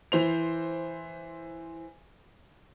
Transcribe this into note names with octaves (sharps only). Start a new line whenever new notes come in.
E3 C5 F7